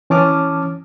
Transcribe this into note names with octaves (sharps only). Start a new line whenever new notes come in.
E3 C#4 A5 D6 D#6 F6